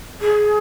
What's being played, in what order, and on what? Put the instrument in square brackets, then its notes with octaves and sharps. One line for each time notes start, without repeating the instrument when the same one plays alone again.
[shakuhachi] G#4